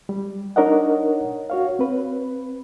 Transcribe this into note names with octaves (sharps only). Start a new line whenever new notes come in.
G3
D4 D#4 A#4 C#5 D#5 F#5
F#4 C#5 F5
C4 B4